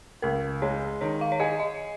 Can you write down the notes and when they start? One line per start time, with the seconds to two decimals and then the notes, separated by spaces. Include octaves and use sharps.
0.22 C#2 A#4
0.62 G#3 C#5
1.01 D#3 C#5
1.21 F5
1.32 C#5
1.40 G#4 D#5
1.60 D#5